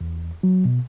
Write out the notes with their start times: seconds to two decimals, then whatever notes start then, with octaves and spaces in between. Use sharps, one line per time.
0.01 E2
0.43 F#3
0.65 B2